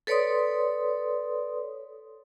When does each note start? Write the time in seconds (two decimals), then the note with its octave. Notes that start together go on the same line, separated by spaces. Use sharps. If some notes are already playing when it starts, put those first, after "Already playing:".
0.07 A4 B4 C#5 D5 C6 D#6